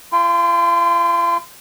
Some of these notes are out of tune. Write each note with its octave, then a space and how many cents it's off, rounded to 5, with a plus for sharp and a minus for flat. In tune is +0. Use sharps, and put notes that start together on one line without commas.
F4 -35 G5 +20 C6 +0